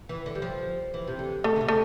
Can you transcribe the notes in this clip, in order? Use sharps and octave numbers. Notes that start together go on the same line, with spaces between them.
E3
D3
G3
F3
E3
C3
D3
D3 A3
D3
C3
A3